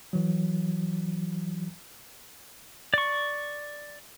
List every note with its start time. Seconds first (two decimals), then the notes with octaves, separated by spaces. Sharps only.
0.13 E3 F#3
2.94 D5 C#6